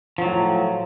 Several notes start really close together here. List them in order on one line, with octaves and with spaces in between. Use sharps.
F3 F#3 A2